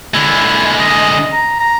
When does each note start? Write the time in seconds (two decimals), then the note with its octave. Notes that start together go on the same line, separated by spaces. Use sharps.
0.14 D3 G#3 E4
0.79 D#5
1.32 A#5
1.59 A#5